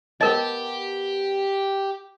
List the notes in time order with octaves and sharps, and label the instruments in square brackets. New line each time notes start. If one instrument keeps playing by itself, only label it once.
[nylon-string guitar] B3 A5 [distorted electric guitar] G4 [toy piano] A#4 D#5